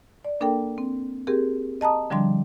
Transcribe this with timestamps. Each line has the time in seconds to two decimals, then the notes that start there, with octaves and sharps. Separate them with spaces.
0.25 D5
0.41 A#3 D4 A4 A#4 G5
0.78 C4
1.27 C4 G4 G#4 A#4
1.81 D#5 A5 A#5 D#6
2.10 D3 F3 G3 D4 C6